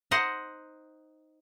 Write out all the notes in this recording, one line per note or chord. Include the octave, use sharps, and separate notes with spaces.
D#4 C5 D#5 F#5